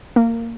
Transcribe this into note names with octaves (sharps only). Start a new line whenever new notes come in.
A#3